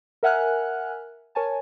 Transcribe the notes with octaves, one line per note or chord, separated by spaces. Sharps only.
A#4 E5 F#5 G#5 F6 F#6
A#4 C#5 G#5 A5